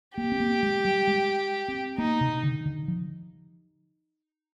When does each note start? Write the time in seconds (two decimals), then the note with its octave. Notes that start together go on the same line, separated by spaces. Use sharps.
0.18 A#3 G4
0.32 C4
0.40 A#3
0.63 G#3
0.85 G3
1.07 G#3
1.68 C4
1.98 A#3 D#4
2.21 C3
2.43 D3
2.65 D3
2.88 F3